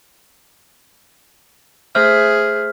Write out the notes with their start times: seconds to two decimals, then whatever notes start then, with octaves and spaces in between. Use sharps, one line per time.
1.95 A3 G#4 C5 E5 F6